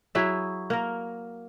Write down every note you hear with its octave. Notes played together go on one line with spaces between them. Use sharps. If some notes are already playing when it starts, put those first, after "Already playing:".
F#3 E4 G#4 E5
A#3 A#4